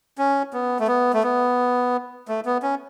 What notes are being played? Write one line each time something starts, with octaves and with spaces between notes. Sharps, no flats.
C#4
B3
A3
B3
A3
B3
A3
B3
C#4